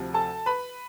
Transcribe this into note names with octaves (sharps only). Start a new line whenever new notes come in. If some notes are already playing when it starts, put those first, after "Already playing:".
Already playing: D2 C3 F3
A4 A5
B4 B5